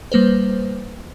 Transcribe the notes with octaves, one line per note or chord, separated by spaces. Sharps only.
G3 A#3 B4 C5